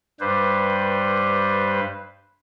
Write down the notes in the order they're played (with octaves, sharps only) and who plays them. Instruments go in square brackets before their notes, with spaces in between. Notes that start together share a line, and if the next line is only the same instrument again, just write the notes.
[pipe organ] G2 G3 B4 C5